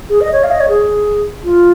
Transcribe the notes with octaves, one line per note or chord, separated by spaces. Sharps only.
G#4
D#5
C#5
F5
D#5
C#5
G#4
F4